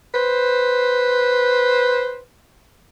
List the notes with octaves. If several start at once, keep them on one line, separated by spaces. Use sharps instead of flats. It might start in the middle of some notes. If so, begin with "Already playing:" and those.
B4 C5